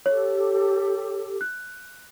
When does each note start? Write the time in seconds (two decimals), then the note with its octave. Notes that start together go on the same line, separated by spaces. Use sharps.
0.06 G4 A4 C#5
1.41 F#6